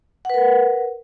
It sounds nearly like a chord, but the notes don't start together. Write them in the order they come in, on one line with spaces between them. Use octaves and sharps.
F#5 B4 A#4